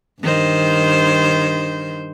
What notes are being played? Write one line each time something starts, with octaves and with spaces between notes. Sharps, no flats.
G2 D#3 C5